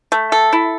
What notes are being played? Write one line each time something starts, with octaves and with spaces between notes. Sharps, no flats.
A3
A4
E4